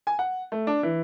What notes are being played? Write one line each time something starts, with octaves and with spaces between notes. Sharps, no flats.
G#5
F#5
A3
D4
E3